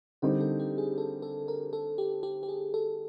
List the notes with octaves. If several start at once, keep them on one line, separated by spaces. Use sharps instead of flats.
D3 G3 C4 D#4 A#4
A4
G4
G#4
A4
A4
A#4
A4
G4
G4
G4
G#4
A4